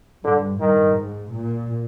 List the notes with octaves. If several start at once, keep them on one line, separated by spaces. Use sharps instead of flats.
G2 D3
G2 D#3
G#2
A#2